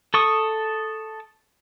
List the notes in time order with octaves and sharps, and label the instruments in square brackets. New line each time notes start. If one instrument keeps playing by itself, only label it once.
[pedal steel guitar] A4 C#6 D#6